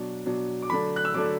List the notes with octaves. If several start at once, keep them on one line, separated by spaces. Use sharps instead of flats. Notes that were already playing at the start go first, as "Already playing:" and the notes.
Already playing: B2 F#3 D4
B2 F#3 D4
D6
D3 F#3 A3 D4 B5
F#6
E6
D3 F#3 A3 D4 D6